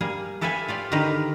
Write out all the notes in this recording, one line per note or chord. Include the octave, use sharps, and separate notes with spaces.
G3 A#3 G#4
G4 A4 B4 E5 F5 G#5
F4 G4 D5
D3 D#3 D#4 G4 A#4 B4